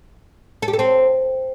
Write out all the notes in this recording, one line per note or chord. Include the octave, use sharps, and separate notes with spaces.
A4
G4
A4
C4